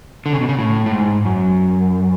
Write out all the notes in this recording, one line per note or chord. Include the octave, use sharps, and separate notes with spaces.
D3
C#3
B2
C#3
A2
A2
G#2
F#2